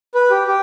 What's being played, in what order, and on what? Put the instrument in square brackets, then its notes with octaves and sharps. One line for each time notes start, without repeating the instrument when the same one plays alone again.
[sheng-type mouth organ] B4
G4
G4